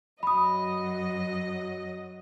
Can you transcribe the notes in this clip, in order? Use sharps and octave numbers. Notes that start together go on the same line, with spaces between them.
F#2 F#3 D#5 B5 D#6